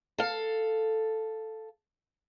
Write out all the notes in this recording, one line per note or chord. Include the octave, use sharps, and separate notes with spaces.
A4 F5